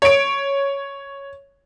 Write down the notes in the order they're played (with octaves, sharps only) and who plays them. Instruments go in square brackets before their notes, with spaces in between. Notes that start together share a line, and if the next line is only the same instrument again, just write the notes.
[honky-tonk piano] C#5 D7